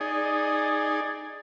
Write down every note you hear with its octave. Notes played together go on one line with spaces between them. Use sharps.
D#4 G#4 D5